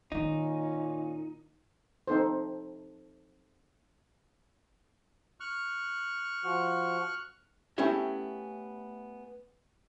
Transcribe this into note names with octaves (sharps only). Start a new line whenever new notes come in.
A#2 D#3 C#4 D#4 F4
C4 D#4 A4 C5
C#6 F6 F#6
F3 F#4
A3 B3 C#4 E4 G4 E5